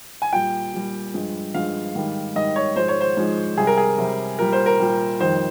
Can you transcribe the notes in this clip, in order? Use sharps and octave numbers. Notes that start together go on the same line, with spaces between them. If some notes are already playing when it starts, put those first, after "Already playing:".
G#5
A#2 G3 G5
A#2 G3
G2 F3 G#3
G2 F3 G#3 F5
G#2 D#3 G3
G#2 D#3 G3 D#5
C#5
G#2 F3 G#3 C5
C#5
C5
G#2 F3 G#3
C3 G3 G#4
A#4
G#4
C3 G3
A#2 G3 A#4
C5
A#4
A#2 G3
F2 D#3 G3 C5